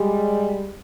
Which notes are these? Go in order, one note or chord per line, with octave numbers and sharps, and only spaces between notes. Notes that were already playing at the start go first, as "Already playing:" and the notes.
Already playing: G3 G#3